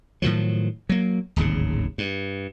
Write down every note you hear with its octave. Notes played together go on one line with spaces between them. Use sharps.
A2 D#3 F3 F#3
F#3 A#3
D1 G#1 D#2 C#3
G2